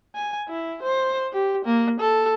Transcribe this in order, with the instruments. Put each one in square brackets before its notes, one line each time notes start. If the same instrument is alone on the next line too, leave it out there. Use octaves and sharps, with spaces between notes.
[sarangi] G#5
E4
C5
G4
A#3
A4